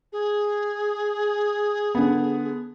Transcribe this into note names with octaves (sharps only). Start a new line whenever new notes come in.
G#4
D3 B3